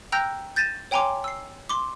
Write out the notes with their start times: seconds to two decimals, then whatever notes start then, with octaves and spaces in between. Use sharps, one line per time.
0.12 G5 A#5 E6 F#6 G6 A#6
0.56 G6 A6 A#6 D#7 E7
0.91 C#5 G5 G#5 A#5 C6 D6
1.24 E6 C7
1.69 C6 D6